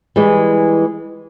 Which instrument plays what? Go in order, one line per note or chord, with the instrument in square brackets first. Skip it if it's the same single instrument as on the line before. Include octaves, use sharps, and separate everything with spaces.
[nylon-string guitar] E3 G3 G#3